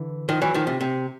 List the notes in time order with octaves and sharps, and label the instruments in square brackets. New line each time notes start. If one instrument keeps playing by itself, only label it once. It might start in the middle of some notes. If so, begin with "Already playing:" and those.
Already playing: [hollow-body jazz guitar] D3 E3
D#3 F3
E3 F#3
D#3 F3
C3
C3